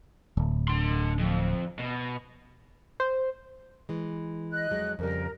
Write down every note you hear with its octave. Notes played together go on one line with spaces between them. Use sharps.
D1
D4 C6
F2
B2
C5
E3 G#3
D#5 F#6
F2 F#3 G#3
F2 C#3 G3 A#4